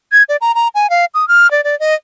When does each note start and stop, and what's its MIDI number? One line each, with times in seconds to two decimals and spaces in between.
0.12 0.23 92
0.29 0.36 74
0.41 0.55 82
0.55 0.68 82
0.75 0.90 80
0.90 1.05 77
1.14 1.27 87
1.28 1.50 89
1.51 1.64 74
1.64 1.78 74
1.80 1.95 75